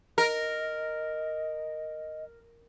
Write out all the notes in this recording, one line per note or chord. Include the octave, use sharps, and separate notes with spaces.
A#4 D#5